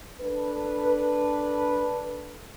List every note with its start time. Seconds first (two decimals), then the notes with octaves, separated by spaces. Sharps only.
0.21 D4 A4 B4